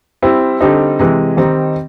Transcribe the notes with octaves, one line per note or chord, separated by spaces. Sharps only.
G3 C4 E4
D3 G3 C4 D#4
C3 E3 G#3
D#3 G3 C4 D#4